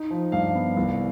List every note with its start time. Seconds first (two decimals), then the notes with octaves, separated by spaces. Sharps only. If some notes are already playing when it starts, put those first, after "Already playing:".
Already playing: D#4
0.10 F3
0.32 G2 F5
0.55 B3
0.77 C2